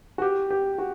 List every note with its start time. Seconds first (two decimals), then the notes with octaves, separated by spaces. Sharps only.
0.18 F#4
0.22 G4
0.50 G4
0.78 F#4